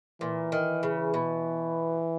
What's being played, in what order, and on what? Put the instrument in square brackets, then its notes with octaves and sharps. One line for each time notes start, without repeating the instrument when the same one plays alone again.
[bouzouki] A#2 [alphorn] E3
[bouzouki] D#3
C#3
B2